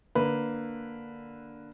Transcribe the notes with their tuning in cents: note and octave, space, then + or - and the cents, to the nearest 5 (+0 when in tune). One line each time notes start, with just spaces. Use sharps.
D3 +0 A#3 +0 B4 +0